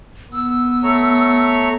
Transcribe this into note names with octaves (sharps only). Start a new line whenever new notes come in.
B3 E6
A3 C#5 A#5